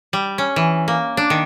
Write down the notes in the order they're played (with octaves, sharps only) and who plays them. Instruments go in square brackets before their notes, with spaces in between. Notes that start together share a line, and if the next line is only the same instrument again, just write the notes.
[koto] G3
C#4
E3
A#3
D4
D#3